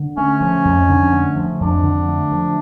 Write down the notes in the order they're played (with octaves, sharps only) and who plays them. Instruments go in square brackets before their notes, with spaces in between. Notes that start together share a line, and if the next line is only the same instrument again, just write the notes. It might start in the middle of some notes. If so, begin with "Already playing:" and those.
Already playing: [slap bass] D3
[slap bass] A3 [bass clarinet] C#4
[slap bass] F3
F2
D3
A3
F3
[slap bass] F2 [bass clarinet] D4
[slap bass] D3
A3
F3